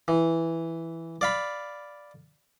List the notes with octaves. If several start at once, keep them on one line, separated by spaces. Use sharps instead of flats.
E3
D5 F5 B5